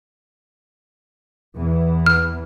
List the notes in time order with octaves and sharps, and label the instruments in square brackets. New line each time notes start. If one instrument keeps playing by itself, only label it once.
[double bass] E2 E3
[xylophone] F6